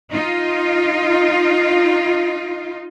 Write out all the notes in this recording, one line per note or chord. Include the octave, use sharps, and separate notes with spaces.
D#4 F4